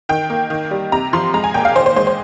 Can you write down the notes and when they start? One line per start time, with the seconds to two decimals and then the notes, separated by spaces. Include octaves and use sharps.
0.09 D#3 G5
0.30 A#3
0.50 D#3
0.71 G3
0.92 C3 A#5
1.13 F3 C6
1.34 G#3 A#5
1.44 G#5
1.54 A#2 G5
1.65 F5
1.75 D#3 C5
1.86 C5
1.96 G#3 C5
2.07 C5